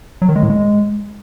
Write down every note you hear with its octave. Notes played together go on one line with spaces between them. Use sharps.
F#3
D#3
G#3
A2
G#3